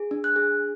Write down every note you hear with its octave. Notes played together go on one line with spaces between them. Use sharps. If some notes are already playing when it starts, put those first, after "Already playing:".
Already playing: G#4
D4
F#6
G#4